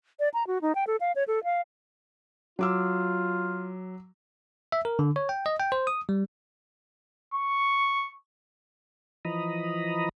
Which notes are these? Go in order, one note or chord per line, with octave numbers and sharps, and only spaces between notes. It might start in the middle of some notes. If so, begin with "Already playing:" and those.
D5
A#5
F#4
D#4
G5
A4
F5
C#5
A4
F5
F#3 F4 D6 E6
E5
A#4
D3
C#5
G5
D#5
G5
C5
D#6
G3
C#6
E3 F3 D#5 A#5 B5 D#6